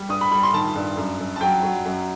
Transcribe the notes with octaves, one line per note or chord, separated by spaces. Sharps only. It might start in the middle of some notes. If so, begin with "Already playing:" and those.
Already playing: G3
G2 D#6
B5
G3 B5
C6
D#3 A5
G2
F#2
F#2
A5
F#3 G5
F#3
F#2